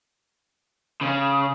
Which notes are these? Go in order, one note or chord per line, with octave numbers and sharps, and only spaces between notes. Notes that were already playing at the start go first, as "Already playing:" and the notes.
C#3